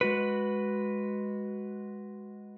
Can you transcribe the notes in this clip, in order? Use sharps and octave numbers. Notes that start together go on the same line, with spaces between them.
G#3 F#4 B4